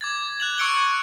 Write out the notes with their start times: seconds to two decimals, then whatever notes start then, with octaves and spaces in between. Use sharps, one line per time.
0.01 D6 G#6 A6
0.40 F#6 G#6 F7 F#7
0.58 C#6 E6 C#7 D7 F#7 G7
0.75 C#6 F#6